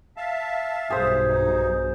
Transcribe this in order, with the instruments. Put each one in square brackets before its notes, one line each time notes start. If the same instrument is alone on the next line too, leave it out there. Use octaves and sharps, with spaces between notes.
[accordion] E5 F5 A5
[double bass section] B1 G2 [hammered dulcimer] G#4 C5
[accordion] D#4